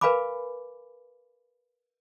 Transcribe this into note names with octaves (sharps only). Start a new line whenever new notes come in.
A#4 B4 F5 G#5 B5 D6